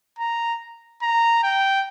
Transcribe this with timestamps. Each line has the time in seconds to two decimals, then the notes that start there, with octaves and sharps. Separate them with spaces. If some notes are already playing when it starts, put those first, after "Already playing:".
0.19 A#5
1.02 A#5
1.44 G5